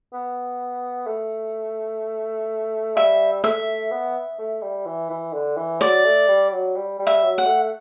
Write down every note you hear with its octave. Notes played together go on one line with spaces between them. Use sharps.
B3
A3
G3 E5
A3 E5
B3
A3
G3
E3
E3
D3
E3
F#3 D5
A3
G3
F#3
G3
G3
E5
F#3
F#5
A3